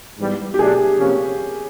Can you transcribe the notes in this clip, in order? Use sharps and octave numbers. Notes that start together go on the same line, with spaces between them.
G#2 E3 G3 B3
G4
B2 F#3 A3 D4 G#4
C3 F3 A#3 C#4